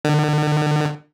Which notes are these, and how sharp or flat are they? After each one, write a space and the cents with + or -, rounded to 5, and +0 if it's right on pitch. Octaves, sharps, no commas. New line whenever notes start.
D3 +40